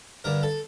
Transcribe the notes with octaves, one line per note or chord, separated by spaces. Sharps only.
G2 D3 A#4
A4